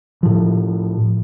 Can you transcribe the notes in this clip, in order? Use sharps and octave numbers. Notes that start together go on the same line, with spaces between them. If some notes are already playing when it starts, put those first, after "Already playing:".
A2 F3